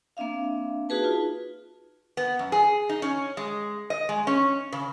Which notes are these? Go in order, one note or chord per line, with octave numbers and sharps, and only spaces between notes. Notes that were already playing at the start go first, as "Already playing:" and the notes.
A#3 C4 D4 E5 F5
D#4 F#4 G#4 B4 A5
F4
B3
F#2
G#4
D#4
C#4
G#3
D#5
G#3
C#4
C#3